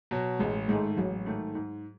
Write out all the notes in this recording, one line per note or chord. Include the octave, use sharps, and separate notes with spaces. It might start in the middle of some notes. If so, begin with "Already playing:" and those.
B2 F#3
A1 G#3
G#2 D#3 G#3 A3
A1 F#3
G#2 D#3 A3
G#2